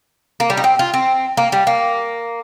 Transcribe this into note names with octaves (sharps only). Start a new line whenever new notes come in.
A#3
G3
D#4
C4
F4
C4
A#3
G3
A#3